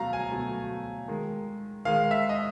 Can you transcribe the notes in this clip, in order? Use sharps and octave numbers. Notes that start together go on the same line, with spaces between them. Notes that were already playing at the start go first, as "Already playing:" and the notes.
Already playing: B2 F#3 A3 F5 A#5
G#5
B2 F#3 A3
D#3 G#3
D#3 G#3 F5
E5
D#5